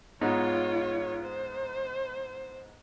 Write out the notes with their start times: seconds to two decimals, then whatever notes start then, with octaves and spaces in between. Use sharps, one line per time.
0.21 G#2 B3 D#4 F4 C#5
1.25 C5